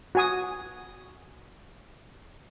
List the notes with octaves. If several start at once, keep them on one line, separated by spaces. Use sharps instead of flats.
F#4 G#5 D#6